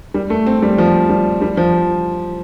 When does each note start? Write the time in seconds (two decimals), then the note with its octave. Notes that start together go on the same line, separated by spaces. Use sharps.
0.14 G3
0.30 A3
0.47 C4
0.62 G3
0.78 F3
1.09 G3
1.42 G3
1.57 F3